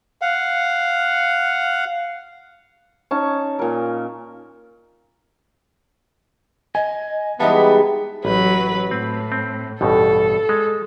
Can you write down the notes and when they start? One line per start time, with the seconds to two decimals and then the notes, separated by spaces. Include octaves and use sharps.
0.21 F5 F#5
3.11 C#4 D#4 A5
3.59 A#2 A#4
6.75 D#5 G#5
7.40 E3 G3 G#3 B3 D#4 D#5 E5 A5
8.25 A1 F#3 B4
8.91 A2 C4
9.32 C4
9.81 A1 G2 B2 A4
10.49 G#3